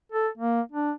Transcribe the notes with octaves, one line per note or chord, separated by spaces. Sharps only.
A4
A#3
D4